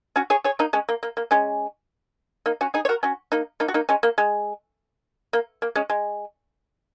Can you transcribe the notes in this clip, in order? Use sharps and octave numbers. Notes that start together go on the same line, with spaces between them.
C#4 F#4
G#4 C#5
G#4 C#5
A#3 D#4
G#3 C#4
A#3
A#3
A#3
G#3 C#4
A#3 D#4
C#4 F#4
D#4 G#4
C#5
F#4 A#4
C#4 F#4
A#3 D#4
A#3 D#4
F#4
A#3 D#4
G#3 C#4
A#3
G#3
A#3
A#3
G#3 C#4
G#3